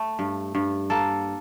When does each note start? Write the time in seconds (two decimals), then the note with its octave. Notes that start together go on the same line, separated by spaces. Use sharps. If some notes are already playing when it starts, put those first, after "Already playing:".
Already playing: A3
0.19 G2
0.55 G2
0.90 A#3 A4